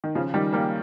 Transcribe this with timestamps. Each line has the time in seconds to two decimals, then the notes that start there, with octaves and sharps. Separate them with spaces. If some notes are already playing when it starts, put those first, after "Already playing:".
0.04 D#3
0.15 C#3 F3
0.34 D#3 G3
0.53 G3 A#3